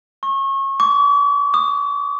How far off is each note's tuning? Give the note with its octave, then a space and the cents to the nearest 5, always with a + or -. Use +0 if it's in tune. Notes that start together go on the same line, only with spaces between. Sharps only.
C#6 -30
D6 -45
D#6 -30